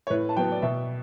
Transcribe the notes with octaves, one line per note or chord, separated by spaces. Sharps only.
C#5
A2 B4
A5
F#3 B3 G5
D5
B2 E5